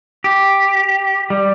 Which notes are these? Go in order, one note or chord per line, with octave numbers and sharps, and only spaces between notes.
G4
G3